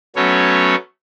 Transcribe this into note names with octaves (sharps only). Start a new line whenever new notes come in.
F#3 A3 B3 C#4 C#5